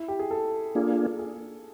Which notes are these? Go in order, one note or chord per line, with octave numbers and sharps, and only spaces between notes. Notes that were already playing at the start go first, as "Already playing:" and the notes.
Already playing: E4
G4
G#4
A4
A#3 D4 F4 G#4
G#4